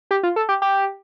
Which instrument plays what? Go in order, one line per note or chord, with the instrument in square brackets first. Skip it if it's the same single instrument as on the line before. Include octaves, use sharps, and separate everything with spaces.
[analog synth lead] G4
F4
A4
G4
G4